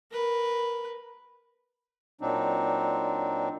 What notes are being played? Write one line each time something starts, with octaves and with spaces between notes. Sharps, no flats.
A#4 B4
A#2 F#3 C4 D4 D#4